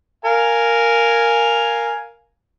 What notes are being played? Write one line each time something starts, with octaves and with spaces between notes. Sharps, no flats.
A#4 F5 G#5